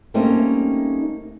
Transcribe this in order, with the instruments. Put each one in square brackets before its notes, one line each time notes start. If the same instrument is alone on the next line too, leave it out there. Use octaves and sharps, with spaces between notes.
[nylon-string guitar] G3 A3 A#3 C4 C#4 D#4